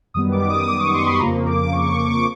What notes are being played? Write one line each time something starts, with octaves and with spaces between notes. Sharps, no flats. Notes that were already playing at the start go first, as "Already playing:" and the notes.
F#2 D#3 G3 B3 D#6
D6
D#6
D6
C#6
C6
B5
F2 C#3 F3 A#3 A#5
D6
C#6
D6
C#6
D6